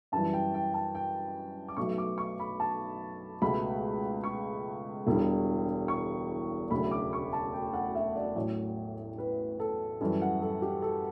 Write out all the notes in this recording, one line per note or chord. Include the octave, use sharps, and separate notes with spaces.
F#2 E3 G3 A5
G5
G5
A5
G5
D6
B1 B2 F#3 A3 C#6
D6
C#6
B5
A5
C#2 B2 A3 B5
C#6
E1 E2 D3 G3
C#6
E1 D2 C#3 F#3 A3 B5
D6
C#6
A5
G5
F#5
E5
D5
A1 A2 F#3 C#5
B4
A4
F#2 E3 G3 A4
F#5
A4
G4
A4